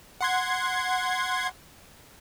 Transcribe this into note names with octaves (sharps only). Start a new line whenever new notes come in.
F#5 C6 G#6